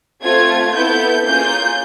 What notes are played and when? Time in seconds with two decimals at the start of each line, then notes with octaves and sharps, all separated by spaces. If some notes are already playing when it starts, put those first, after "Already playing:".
0.23 A3 C4 F4 G#6
0.75 B3 E4 A4 G6
1.26 A#3 C#4 F4 G#4 G6